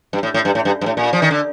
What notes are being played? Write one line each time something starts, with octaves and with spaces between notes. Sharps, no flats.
G2
A2
A2
G2
A2
G2
G2
A2
A#2
F3
D#3
D3